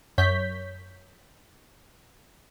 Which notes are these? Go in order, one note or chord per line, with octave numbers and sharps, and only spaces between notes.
F#2 C#5 G6 B6